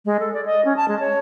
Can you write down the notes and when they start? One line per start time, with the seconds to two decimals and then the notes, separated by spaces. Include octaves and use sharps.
0.05 G#3
0.20 A4
0.33 D5
0.45 D#5
0.65 C#4
0.77 A5
0.88 G#3
1.00 C#5